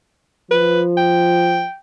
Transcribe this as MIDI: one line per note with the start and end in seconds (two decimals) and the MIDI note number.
0.51 1.65 53
0.51 0.81 71
0.97 1.76 79